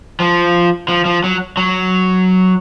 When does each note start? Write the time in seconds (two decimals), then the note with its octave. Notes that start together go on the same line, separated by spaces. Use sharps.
0.20 F3
0.88 F3
1.06 F3
1.24 F#3
1.57 F#3